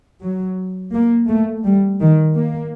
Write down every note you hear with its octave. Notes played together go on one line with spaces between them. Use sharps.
F#3
A#3
A3
G3
D#3
A#3